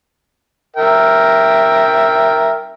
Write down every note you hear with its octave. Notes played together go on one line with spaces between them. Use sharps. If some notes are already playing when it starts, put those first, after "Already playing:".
A#4 E5 G5